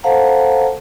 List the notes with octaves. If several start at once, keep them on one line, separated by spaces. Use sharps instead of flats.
A4 C5 F5 F#5 A5 A#5